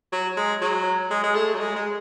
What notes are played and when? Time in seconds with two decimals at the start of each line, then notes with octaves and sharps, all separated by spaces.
0.13 F#3
0.37 G#3
0.62 F#3
1.11 G#3
1.23 G#3
1.35 A3
1.54 F#3
1.60 G#3
1.76 G#3